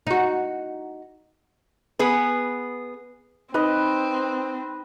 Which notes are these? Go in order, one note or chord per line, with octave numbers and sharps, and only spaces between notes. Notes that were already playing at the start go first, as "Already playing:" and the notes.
D#4 F#4
B3 G#4 B4
C4 D#4 B4 D#5